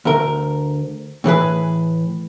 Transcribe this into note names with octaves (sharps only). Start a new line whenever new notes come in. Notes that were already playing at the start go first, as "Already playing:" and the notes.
D2 A#4
A2 E3 G#4 B4